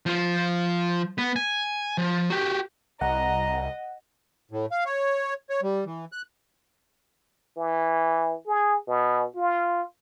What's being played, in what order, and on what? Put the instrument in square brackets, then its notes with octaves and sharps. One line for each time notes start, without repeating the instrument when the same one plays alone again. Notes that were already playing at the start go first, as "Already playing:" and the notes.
[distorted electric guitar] F3 F4
B3
G#5
F3
F#4 G4
[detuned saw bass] C2 [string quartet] D#5 [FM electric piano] F#5 [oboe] A#5
[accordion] A2
F5
C#5
C#5
G3
E3
F#6
[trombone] E3
G#4
B2
F4